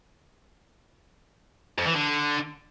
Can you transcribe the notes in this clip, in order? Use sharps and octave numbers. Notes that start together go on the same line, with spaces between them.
F2
E3
D3